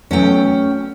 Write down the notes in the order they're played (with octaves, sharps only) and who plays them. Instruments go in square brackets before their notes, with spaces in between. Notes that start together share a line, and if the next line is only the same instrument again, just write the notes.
[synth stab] F#3 A3 B3 [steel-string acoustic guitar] C#4 G5